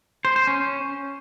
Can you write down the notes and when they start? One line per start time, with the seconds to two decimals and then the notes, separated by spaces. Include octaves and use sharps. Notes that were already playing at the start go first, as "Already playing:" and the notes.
0.25 C5
0.36 C5
0.47 C#4